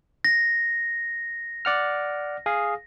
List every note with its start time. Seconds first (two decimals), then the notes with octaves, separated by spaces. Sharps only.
0.24 A#6
1.65 D5 F#5 F6
2.46 G#4 F5 D#6